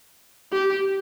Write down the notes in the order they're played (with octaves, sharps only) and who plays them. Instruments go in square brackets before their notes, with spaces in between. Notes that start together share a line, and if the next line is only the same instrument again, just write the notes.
[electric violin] G4